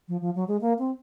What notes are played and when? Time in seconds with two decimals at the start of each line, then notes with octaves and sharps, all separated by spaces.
0.08 F3
0.21 F3
0.35 F#3
0.48 G#3
0.61 A#3
0.79 C4